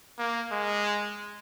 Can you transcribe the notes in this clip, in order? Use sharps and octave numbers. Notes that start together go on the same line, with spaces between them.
A#3
G#3